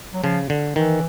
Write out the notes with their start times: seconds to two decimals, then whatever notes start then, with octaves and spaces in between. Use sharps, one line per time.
0.14 F#3
0.23 C#3 F3
0.50 D3
0.76 D#3 E3